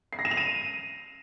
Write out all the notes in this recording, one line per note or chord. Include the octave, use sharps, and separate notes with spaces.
C7
A#6
E7
F7
D#7